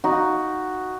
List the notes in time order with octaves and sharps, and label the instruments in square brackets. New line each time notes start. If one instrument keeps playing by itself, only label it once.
[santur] D#4 [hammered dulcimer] F#4